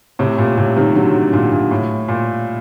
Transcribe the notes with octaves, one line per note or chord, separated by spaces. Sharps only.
A2 C3
A#2
A2 C3
C3 D#3
D3 F#3
A#2 D3
A#2
A2
A#2